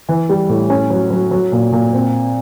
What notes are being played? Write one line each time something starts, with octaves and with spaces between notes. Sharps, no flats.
E3
G3
A2
C#4
F#3
F#3
F#3
A#2
A#2
C4